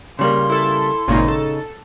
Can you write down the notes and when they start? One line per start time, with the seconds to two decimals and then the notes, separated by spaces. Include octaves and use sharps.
0.19 C#3 G3 A#3 C6
0.50 E4 A4
1.08 G#1 A#2 C#3 D#4
1.28 A4